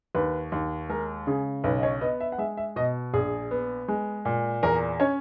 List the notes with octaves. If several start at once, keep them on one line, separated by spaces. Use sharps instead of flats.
D#2 B4
D#2
G#3 A#4
C#3 G#4
B1 B4
D#5
C#5
B3 D#5
E5
F#5
G#3 E5
E5
B2 D#5
A#1 G#4
B3
G#3
A#2
E2 A#4
C#4 C#5